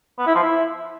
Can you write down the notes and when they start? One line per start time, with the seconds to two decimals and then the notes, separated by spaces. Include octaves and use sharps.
0.18 B3
0.27 E4
0.35 F3
0.43 E4